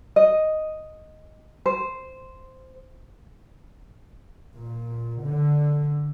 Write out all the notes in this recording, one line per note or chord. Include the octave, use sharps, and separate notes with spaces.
D#5
C5
A#2
D3